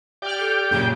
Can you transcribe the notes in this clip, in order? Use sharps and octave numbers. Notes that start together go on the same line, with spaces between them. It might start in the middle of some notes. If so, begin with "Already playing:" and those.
G4 D5 G5 D6 F6
A4
F#2 A#2 C#3 F#3